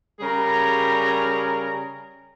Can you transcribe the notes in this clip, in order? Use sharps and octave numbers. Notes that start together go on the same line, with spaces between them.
C#3 G3 G#4 A#4 A#5